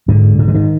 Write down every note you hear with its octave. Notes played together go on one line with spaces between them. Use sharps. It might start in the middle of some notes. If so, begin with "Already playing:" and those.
G#2 D3
G#2
D3
D#3